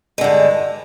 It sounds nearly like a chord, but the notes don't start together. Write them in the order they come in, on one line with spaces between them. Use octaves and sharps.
G#3 D3 G2